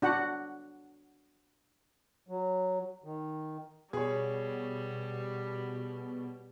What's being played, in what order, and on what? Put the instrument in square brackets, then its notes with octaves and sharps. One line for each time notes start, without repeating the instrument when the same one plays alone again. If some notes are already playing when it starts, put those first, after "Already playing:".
[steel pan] D4 F#4 F#5
[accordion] F#3
D#3
[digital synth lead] B2 [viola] G3 [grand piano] G#4 C#5